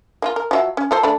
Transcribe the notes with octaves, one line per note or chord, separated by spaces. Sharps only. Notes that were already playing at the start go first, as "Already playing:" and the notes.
A#3 E4 F4
A#4
F3 F#3 E5
C#4
F3 A4 C5
A3 D4 B5